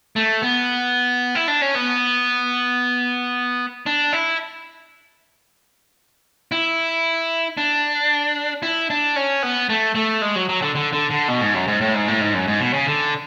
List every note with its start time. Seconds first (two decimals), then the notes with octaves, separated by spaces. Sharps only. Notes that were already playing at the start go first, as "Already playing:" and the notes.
0.16 A3
0.42 B3
1.35 E4
1.48 D4
1.61 C#4
1.75 B3
3.86 D4
4.13 E4
6.52 E4
7.57 D4
8.63 E4
8.90 D4
9.16 C#4
9.43 B3
9.69 A3
9.95 A3
10.21 G#3
10.36 F#3
10.49 F#3
10.62 D3
10.75 D3
10.93 D3
11.10 D3
11.28 B2
11.41 G#2
11.54 F#2
11.68 G#2
11.81 A2
11.94 G#2
12.08 A2
12.21 G#2
12.34 F#2
12.48 G#2
12.60 B2
12.74 C#3
12.87 D3